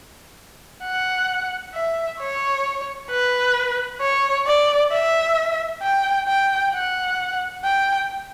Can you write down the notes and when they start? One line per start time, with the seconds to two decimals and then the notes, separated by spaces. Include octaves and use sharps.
0.84 F#5
1.75 E5
2.20 C#5
3.10 B4
4.01 C#5
4.46 D5
4.92 E5
5.82 G5
6.28 G5
6.73 F#5
7.64 G5